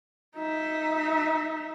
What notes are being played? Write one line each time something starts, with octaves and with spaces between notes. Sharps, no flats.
D#4 E5